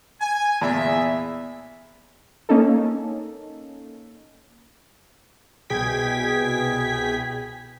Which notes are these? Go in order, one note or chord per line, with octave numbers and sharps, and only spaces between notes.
G#5
E2 A#2 G#4 E5
A#3 C#4 D#4 A4
C2 B2 G#4 G5 G#6 B6